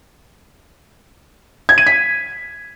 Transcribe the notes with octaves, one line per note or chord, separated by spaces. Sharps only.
G#6
D#7
B6